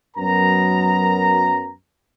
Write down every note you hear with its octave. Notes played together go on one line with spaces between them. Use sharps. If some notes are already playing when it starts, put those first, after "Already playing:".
F#2 F#3 B3 A#4 A#5